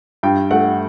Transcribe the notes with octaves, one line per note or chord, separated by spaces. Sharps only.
G2 G5
A3 F#5